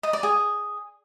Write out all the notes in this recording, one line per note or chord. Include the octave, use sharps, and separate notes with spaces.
D#5
D5
G#4